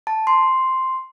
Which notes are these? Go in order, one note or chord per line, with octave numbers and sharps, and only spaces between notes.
A5
C6